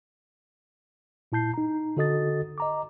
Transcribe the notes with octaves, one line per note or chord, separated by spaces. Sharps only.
A#2 E4 A5 G6 C7
D#4 A#5
D3 F#4 A4 D#5 D#6 A6
D#5 A#5 D6